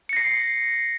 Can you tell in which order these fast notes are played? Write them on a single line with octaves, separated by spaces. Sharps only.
C#7 A#6 C7